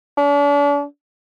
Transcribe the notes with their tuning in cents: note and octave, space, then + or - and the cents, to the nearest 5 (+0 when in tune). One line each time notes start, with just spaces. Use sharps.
D4 -40